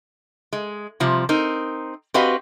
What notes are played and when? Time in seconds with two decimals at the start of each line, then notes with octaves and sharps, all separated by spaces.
0.53 G#3
1.00 C3 F3 G3
1.29 C4 D#4 A#4
2.14 C4 F#4 G4 B4 D#5 F5